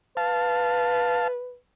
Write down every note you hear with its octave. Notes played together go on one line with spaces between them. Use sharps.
B4 F5 A5